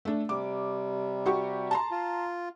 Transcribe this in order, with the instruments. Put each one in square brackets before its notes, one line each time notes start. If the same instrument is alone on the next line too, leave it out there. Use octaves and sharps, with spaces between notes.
[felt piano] A3 D4
[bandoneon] C3 G3 [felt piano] D6
[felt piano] F#4 G4 C#6
A5 A#5 C6
[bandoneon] F4